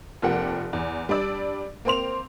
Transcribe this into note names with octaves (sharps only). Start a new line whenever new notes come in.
F1 F3 A#3 G4 F#5
E2
G3 D4 D5 E6
A#3 C4 C6 F7